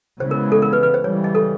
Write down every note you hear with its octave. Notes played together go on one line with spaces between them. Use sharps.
C#3 E3 G#3 B3 C5
A#4
A4
A#4
B4
B4
C5
C#3 E3 G3 C#5
D#5
A4